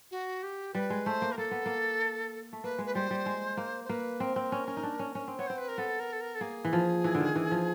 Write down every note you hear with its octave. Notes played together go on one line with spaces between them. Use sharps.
F#4
G4
G3 B4
G#3
A3 C5
A#3
A#4
A#3 A4
B3
A#3
A3
A#3 B4
G#3
B4
G3 C5
G3
G#3
A#3
C5
A#3 B4
C4 A#4
C4
C#4
C#4
D#4
D4
C#4
C#4
C4
B3 C#5
C4 C5
B4
A#4
B3 A4
A#4
A4
A#4
A4
A#3 G#4
E3
F3
E3
D3
D#3
E3
F3